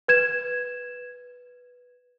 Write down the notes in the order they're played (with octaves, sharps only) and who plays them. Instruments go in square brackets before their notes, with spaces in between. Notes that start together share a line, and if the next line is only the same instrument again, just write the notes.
[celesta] B4 G#6 E7